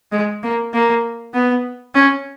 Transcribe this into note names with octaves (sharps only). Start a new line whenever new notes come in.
G#3
A#3
A#3
B3
C#4